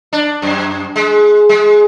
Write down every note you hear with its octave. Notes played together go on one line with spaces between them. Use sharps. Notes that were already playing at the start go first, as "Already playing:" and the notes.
D4
F#2
G#3
G#3